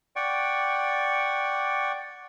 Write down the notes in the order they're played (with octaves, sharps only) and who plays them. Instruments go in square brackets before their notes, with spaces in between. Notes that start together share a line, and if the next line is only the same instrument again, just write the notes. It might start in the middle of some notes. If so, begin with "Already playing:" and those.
[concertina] D5 F#5 G5 C#6